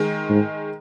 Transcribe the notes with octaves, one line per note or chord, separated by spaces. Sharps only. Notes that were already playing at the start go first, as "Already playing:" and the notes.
Already playing: D#3 G#3
G#2